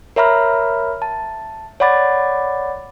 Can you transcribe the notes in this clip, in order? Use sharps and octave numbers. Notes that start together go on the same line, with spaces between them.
A#4 C#5 E5 A#5 B5 F6
A5
C#5 D5 F#5 B5 D6 A6